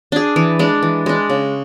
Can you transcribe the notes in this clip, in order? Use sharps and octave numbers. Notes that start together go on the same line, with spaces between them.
D4 G#4
E3
G#3 D4
E3
G#3 D4
C#3